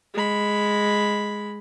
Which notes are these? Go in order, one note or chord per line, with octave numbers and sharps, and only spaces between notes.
G#3 B5